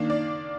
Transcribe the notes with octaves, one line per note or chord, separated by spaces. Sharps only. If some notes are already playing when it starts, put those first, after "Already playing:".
Already playing: D#3 A#3 D4
D5